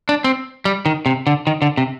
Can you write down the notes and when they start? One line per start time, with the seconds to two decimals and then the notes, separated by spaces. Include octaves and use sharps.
0.09 D4
0.24 C4
0.65 G3
0.86 D#3
1.06 C3
1.27 D3
1.47 D#3
1.62 D3
1.78 C3